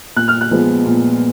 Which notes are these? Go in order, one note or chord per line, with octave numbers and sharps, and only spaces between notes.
A#2 F#6
F6
F#6
F3 G#3 B3
A#2